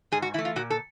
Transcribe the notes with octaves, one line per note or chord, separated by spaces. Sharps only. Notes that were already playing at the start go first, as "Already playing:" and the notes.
G#2 G#4
F#4
E3 A3 E4
F4
A#2 F#4
A4